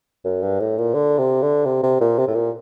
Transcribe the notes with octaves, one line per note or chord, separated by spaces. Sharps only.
F#2
G2
A2
A#2
D3
C3
D3
C3
C3
A#2
C3
A2
A#2